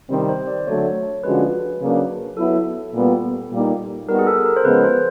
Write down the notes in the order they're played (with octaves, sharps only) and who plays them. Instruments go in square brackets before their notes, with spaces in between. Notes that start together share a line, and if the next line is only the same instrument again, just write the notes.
[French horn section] C3 D#3 G3 C4
[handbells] C5
D5
[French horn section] D3 F#3 A3 [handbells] C#5
[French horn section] D3 F3 G#3 C#4 F#4 [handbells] B4
[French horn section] C#3 F#3 A#3 D4
[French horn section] F#3 B3 E4 [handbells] A4
[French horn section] A#2 G3 B3
A#2 G3 A#3 D#4
[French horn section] G3 B3 D#4 F#4 [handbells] A#4
[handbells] G#4
A4
A#4
C5
[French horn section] C#3 F3 G#3 B3 [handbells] B4
[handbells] C5